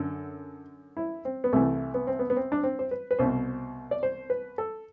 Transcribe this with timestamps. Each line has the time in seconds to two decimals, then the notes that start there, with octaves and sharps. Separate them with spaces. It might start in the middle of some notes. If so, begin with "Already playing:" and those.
Already playing: F#2 D3 A4
0.97 E4
1.25 C4
1.44 B3
1.53 C2 C3 E3 A3
1.94 B3
2.07 C4
2.19 B3
2.30 B3
2.36 C4
2.52 D4
2.63 C4
2.79 C5
2.91 B4
3.11 B4
3.19 C2 B2 C5
3.91 D5
4.03 C5
4.30 B4
4.58 A4